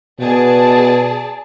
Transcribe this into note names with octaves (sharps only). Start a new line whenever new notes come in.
B2 G#4 D5 A5